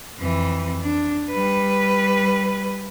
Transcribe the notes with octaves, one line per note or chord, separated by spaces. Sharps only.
F2 E3
D4
G3 B4